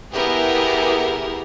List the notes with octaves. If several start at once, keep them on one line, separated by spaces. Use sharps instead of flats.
B3 E4 G4 G#4 A#4 B4